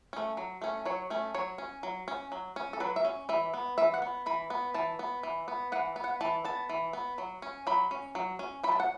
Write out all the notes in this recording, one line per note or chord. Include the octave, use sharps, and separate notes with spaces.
A3 C#4
F#3
A3 C#4
F#3 C#5
A3 C#4
F#3 C#5
C#4
F#3
C#4
F#3
C#4
A4
F#3 B4
E5
C#4
E3 E5
B3
E3 E5
F#5
B3
E3 B5
B3
E3 A5
B3
E3
B3
E3 F#5
B3
F#5
E3 A5
B3 A5
E3
B3
F#3
C#4
F#3 B5
C#4
F#3
C#4
F#3 B5
A5
F#5